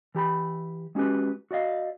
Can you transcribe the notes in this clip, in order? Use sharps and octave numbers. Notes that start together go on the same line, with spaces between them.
E3 G4 A#5 B5
G#3 C#4 F#4 G4 B4
F#4 D5 D#5 F5